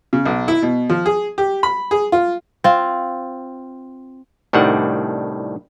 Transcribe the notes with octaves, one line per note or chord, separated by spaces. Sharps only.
C#3
B1
E4
B2
F3
G#4
G4
B5
G#4
F4
C4 F4
C2 A2 D#3 G3 D4 F#5